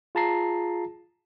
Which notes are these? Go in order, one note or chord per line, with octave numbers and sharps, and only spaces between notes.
F4 G#4 A5 A#5 A#6 C7